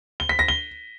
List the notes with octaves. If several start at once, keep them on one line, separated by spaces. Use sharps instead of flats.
G7
B6
A#6
G7